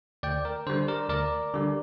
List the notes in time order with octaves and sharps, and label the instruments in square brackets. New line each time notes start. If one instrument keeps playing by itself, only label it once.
[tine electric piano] D2 D5 G5
A#4
D3 G3 C5
A#4 D5
D2 A#4 D5
D3 G3